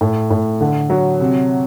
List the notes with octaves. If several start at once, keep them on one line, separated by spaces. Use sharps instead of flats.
A2
A2
D3
F#3
C3